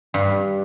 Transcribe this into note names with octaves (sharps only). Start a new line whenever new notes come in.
G2